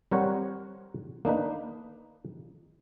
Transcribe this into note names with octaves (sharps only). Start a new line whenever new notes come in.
G3 C4 A#4 C5 C#5 F#5
A#3 D4 D#4 B4